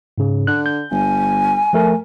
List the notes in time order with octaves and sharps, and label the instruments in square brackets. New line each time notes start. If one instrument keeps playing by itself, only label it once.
[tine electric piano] G#2 C#3
[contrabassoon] D3 [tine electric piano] F#6
[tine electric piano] G6
[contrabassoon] G1 [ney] G#5
[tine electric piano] F3 A3 A#4